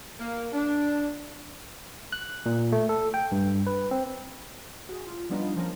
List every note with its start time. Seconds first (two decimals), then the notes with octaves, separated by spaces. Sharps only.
0.20 A#3
0.53 D4
2.12 F#6
2.46 A#2
2.72 A3
2.89 A4
3.14 G5
3.32 G2
3.67 B4
3.91 C4
4.89 F#4 G#4
5.07 F4
5.29 F3 G3 B3 D4 D#4 F4
5.56 F3 A#3 C#4 A#4